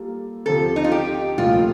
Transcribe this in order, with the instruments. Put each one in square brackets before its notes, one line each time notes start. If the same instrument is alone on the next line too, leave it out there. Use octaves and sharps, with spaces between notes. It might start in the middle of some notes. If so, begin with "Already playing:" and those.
Already playing: [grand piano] G3 A#3 F4 A4
[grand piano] D2 C3 F3 C4 G4 [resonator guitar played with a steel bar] A4
[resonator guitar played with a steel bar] D#4
F4
G4
[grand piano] C2 A#2 F3 A3 [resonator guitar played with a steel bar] F4